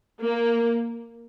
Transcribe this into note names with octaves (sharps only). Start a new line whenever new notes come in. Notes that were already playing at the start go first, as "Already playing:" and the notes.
A#3